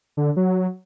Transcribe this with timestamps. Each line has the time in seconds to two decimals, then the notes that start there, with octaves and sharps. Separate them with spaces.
0.17 D3
0.37 F#3